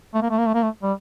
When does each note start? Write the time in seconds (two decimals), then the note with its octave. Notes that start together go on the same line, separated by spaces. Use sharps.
0.14 A3
0.22 A#3
0.31 A3
0.38 A#3
0.47 A3
0.54 A#3
0.63 A3
0.83 G3